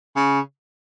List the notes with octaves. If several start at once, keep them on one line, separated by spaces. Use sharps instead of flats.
C#3